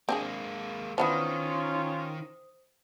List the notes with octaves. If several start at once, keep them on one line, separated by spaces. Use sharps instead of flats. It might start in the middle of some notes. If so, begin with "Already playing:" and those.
G#3 A#3 C4 D4 G#4
D#3 E3 B3 C#4 D4 F4 C5 D#6